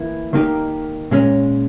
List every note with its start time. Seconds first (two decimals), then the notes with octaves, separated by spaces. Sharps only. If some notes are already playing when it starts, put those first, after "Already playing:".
Already playing: E3 A#3 E4
0.33 D#3 A#3 D#4 G4
1.11 A#2 G#3 C#4